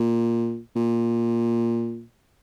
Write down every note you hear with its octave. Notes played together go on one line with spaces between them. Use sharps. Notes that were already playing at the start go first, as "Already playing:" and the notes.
Already playing: A#2
A#2